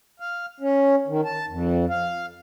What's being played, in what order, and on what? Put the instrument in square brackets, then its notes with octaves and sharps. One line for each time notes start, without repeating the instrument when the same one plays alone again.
[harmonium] F5
C#4
D#3
A5
F2
F5